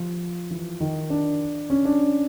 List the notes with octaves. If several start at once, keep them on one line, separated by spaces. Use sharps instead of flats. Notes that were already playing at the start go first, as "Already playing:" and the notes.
Already playing: F3 F4
E3 E4
D#3 D#4
D4
C#4
D4